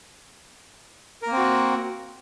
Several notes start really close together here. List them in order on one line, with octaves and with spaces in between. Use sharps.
A#4 A#3 C4 F#4